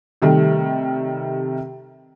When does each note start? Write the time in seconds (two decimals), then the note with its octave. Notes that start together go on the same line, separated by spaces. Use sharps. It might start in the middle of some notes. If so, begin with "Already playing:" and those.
0.22 C3 D#3 G3 A3